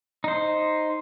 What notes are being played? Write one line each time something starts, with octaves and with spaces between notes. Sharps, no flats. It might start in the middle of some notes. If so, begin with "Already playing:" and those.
D#4 C5